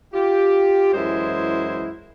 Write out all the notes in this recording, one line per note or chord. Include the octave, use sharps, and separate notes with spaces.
F4 G4
F#2 E3 G#3 E4 C5